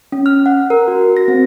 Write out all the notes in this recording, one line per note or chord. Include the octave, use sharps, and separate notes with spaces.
C#4
F6
F#5
A#4
F#4
A#6
C4